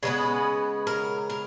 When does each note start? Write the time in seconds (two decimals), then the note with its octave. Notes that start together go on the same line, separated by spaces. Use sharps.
0.03 C#3 G#3 B3 B4
0.87 A#4
1.30 A#4